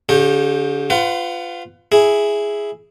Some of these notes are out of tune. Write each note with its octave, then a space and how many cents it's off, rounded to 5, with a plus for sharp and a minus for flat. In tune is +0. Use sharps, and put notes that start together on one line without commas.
D3 -40 G4 +0 C#5 -30
F4 +0 B4 +35 F#5 +25
E4 +0 G#4 +0